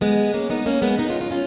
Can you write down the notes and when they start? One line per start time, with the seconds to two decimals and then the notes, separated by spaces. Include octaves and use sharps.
0.01 G#3 B3
0.34 A#3 C#4
0.50 B3 D#4
0.66 A#3 C#4
0.82 G#3 B3
0.98 B3 D#4
1.10 C#4 F4
1.20 C#4 F4
1.31 C#4 F4